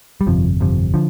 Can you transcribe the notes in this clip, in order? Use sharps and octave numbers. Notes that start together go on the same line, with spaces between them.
G3
G1 F2 C3 F3
G1 F2 C3
D3 F3